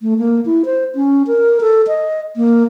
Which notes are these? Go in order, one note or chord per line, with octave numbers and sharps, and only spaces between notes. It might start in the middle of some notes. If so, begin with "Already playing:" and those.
A3
A#3
E4
C5
C#4
A#4
A4
D#5
A#3